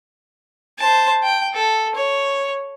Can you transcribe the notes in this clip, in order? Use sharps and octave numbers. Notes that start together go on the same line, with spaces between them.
C5 A5
G5
A4
C#5